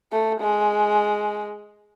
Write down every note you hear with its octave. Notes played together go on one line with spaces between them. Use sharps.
A3
G#3